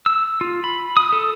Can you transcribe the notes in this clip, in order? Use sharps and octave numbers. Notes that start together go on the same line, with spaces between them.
E6
F4
B5
D#6
A4